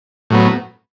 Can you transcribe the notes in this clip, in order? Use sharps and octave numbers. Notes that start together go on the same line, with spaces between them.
A2 F#3 B3